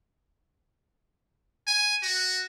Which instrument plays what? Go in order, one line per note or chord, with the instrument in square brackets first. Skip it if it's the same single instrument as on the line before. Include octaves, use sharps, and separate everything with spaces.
[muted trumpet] G#5
F#4